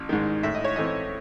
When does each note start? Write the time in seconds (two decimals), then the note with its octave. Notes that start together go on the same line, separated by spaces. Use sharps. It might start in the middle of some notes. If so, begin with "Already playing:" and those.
Already playing: A1
0.09 G#2 D#3
0.43 A2 E5
0.55 D#5
0.64 C#5
0.76 E3 A3 C4 D#5